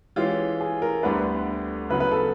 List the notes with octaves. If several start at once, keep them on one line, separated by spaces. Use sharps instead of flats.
E3 G#3 C#4 F4 G4
G#4
A#4
D2 D3 G3 B3 D4 B4
C#3 F#3 B3 B4
B4
A4